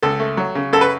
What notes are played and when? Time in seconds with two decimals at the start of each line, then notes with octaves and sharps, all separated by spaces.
0.03 C#2 A4
0.20 A3
0.37 F#3
0.55 C#3
0.73 F#2 A4
0.81 B4